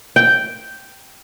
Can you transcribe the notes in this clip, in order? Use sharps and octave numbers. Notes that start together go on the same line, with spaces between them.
G5